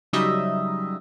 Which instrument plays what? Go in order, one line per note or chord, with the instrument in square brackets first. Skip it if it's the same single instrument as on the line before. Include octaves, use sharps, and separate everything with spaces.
[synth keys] C#3 F#3 G3 D#4 D#5 E5